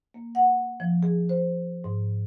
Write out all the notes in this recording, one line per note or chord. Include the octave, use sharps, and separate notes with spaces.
A#3
F#5
F3
G#4
C5
G#2